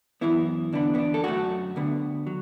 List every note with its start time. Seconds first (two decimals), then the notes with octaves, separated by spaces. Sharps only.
0.21 F#2 E3 B3 E4
0.73 E2 D3 B3 D4
0.95 B3
0.99 D4
1.14 A4
1.24 F#2 F#3 A3 F#4
1.76 D2 D3 B3
2.27 F#3